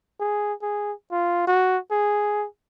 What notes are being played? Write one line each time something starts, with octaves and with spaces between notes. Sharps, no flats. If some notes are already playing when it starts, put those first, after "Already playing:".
G#4
G#4
F4
F#4
G#4